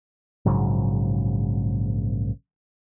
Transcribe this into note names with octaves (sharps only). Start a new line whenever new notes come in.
A#1 G#2 C#3 F#3